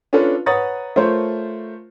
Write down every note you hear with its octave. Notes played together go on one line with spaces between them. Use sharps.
C#4 D4 F4 A4 B4
B4 C#5 F#5 A#5 D#6 A6
A3 F4 A#4 C5 C#5